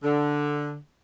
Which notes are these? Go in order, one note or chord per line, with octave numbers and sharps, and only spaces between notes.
D3